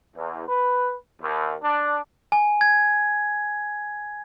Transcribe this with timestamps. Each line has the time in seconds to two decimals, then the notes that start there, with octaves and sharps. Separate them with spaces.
0.16 E2
0.48 B4
1.22 D#2
1.63 D4
2.32 G#5
2.61 G#6